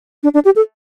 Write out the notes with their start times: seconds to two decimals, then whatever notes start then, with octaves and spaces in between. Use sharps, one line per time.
0.23 D4
0.34 D4
0.45 G4
0.56 A4